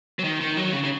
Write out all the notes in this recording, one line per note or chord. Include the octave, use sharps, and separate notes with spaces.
F#3
D#3
D#3
F#3
C#3
C#3